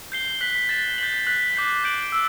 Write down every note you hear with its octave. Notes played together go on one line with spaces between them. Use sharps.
G6 C7 G7
F#6 B6 F#7
A6 E7 G7
G6 B6 F#7
F#6 B6 F#7
D6 G6 C7
G6 D7 F#7
E6